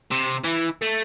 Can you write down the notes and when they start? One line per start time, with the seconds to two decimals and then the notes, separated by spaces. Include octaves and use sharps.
0.11 C3
0.44 E3
0.82 A3